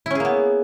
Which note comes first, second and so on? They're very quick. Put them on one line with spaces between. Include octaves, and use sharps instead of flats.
E4 C#4 G#4 A#3 B3